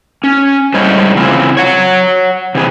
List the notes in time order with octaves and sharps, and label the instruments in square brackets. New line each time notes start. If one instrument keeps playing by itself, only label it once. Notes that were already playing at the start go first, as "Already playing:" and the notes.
[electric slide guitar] C#4
A2 G3 G#3 C#4 C5 D#5
C#3 E3 C4 F4
C#5 F#5
C3 E3 G#4